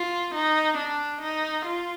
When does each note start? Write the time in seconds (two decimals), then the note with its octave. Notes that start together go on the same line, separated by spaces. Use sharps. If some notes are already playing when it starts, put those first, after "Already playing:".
Already playing: F4
0.35 D#4
0.78 D4
1.22 D#4
1.66 F4